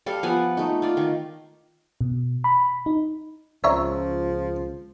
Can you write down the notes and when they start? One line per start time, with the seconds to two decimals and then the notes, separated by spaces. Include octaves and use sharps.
0.06 G3 A4 F5
0.23 F3 B3 F#5 G#5
0.57 A3 D#4
0.82 F4 D5
0.97 D#3
2.01 B2
2.44 B5
2.86 D#4
3.64 C#2 F3 C#5 D5 E5 A#5 C#6 E6